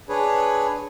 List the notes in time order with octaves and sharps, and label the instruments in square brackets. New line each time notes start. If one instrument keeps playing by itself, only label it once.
[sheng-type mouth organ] D4 G#4 B4 C#5